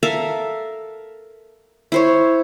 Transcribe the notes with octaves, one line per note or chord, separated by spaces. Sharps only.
A4 A#4 E5 F5
E4 C5 C#5